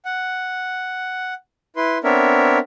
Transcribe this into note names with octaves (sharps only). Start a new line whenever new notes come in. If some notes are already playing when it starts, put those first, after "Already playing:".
F#5
E4 B4 C6
B3 C4 D4 A#4 C#5 E5